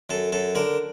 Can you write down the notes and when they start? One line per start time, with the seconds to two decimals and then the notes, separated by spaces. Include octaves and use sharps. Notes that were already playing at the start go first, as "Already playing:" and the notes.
0.10 F#2 A4
0.32 F#2 A4
0.55 D3 A#4